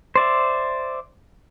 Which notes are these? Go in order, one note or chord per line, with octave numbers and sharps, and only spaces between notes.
C5 D5 E5